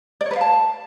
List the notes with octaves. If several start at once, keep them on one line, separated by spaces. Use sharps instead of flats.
D5
C#5
B4
F5
A5